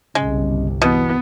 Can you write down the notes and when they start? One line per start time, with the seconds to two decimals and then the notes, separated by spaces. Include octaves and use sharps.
0.15 G1 C2 C#3 G#3
0.82 B2 E3 B3